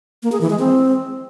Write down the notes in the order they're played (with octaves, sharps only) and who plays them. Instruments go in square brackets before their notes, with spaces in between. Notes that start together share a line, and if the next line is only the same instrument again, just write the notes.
[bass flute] A#3
G#4
E3
G#3
C4